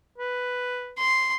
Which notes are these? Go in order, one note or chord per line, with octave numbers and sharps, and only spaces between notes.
B4
C6